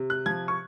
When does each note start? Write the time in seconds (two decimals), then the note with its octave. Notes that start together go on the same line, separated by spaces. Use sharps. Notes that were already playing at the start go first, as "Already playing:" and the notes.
Already playing: C3
0.10 F#6
0.26 F3 G#6
0.48 C#6